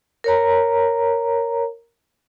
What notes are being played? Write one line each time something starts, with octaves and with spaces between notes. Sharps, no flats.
A#4 C#5 A#5